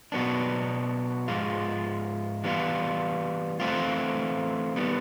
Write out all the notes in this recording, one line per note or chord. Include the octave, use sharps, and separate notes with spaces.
B2 F#3 B3 D4
G#2 F3 G#3 F4
E3 G3 B3 D4 F4
E3 A3 C4 F4
D#3 G3 B3